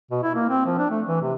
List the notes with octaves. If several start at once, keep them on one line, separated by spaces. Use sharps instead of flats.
B2
E4
A#3
C4
F3
D4
A3
E3
C3